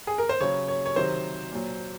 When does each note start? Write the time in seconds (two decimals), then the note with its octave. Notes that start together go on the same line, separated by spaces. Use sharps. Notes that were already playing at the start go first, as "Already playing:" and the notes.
0.07 G#4
0.18 A#4
0.29 C5
0.41 C#3 F#3 C#5
0.68 C#5
0.86 C#5
0.96 C3 D#3 F#3 C5
1.52 A#2 F#3